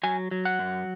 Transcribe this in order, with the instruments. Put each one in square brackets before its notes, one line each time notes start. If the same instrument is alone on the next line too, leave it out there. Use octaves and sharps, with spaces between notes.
[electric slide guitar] F#3 G#5
F#3
F#5
F#2